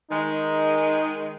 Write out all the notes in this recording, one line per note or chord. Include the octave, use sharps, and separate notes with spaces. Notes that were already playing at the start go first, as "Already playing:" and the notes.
D#3 G#3 D#4